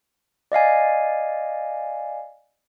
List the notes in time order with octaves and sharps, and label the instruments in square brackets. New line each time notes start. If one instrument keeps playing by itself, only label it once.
[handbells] D5 D#5 F5 G#5